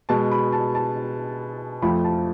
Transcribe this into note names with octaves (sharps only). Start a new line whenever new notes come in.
B2 G#3 A5
B5
A5
A5
F2 F3 A3 B5
A5